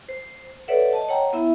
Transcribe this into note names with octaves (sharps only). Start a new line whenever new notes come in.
C5
A4 B4 C#5 D5 E5 F#5
D#5 A5
C#5 F#5 G5 A#5
B3 E4 E5